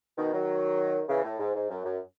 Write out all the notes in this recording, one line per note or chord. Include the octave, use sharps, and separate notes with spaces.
B2 D#3
D#3 F#3
C#3 E3
A2
G#2
G#2
F#2
F#2